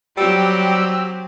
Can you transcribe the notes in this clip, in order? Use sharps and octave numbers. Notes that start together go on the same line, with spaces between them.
F#3 G3 C4 G4 E6